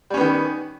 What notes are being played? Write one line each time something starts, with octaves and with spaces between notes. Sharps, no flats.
D#3 G3 B3 C#4